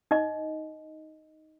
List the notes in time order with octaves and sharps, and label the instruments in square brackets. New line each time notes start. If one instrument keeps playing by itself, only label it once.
[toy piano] D#4 D#5